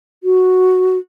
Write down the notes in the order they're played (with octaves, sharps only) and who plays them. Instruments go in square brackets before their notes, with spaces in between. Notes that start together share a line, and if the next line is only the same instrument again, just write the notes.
[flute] F#4